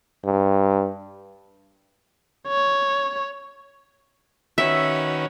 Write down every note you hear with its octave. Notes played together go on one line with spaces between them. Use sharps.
G2
C#5
D#3 C#4 F#4 B4 E5